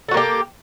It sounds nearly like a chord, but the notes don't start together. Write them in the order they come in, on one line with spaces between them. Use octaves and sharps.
A4 F#4 A#3 G4